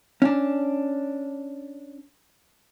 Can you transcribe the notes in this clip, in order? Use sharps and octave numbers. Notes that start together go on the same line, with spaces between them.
C#4 D4